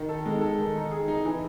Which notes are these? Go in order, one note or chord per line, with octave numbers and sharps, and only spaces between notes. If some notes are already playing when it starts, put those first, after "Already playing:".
Already playing: D#3
A4
G#3
A4
D#3
D#4
G#4
D#4
E3